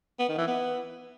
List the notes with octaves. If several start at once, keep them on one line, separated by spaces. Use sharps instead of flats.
B3
D#3
E3
B3